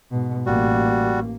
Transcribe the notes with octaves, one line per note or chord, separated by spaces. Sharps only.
G#2 B2
A1 G3 A#3 F#4